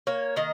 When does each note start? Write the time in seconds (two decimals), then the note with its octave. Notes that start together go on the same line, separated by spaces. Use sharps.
0.07 A#3 C#5
0.36 D#3 D#5